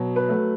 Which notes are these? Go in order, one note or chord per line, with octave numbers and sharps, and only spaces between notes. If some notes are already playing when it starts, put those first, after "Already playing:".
Already playing: B2 F#3
B4
F#3 A3